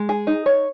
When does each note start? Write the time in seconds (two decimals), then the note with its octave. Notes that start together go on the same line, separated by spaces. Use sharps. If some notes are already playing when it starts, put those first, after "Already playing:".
Already playing: G#3
0.09 G#4
0.27 D#4
0.46 C#5